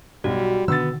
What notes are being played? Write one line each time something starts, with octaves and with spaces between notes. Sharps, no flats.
B1 G3 F#4
B2 D3 D#3 B3 E6 A6